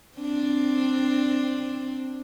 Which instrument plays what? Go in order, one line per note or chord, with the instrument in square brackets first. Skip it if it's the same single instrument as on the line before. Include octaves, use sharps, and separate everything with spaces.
[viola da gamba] C4 D4